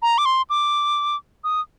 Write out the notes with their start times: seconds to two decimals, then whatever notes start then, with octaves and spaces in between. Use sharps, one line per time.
0.02 A#5
0.18 D6
0.25 C6
0.50 D6
1.44 D#6